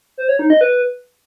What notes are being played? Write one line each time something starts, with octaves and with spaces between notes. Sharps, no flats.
C5
C#5
D#4
D#5
B4